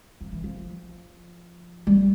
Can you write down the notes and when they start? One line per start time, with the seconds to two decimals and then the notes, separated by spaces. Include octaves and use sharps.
0.21 F3
0.32 E3
0.44 F3
1.87 G3